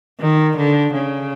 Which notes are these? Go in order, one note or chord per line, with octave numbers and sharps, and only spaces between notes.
D#3
D3
C#3